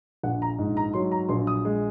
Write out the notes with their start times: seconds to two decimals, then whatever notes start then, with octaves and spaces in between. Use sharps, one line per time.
0.23 A#1 F#5
0.42 A#5
0.59 G#2
0.77 A#5
0.93 F#3 C6
1.12 A#5
1.29 A#1 C6
1.47 D#6
1.65 G#3